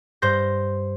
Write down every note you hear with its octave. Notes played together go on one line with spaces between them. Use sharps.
G2 C5 G6 A#6